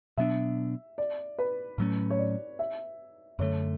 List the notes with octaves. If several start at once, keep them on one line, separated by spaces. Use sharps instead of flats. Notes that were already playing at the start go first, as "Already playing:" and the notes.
B2 F#3 B3 D4 E5
D5
B4
A2 F#3 A3 C#4
C#5
D5
E5
F#2 D3 A3 C#5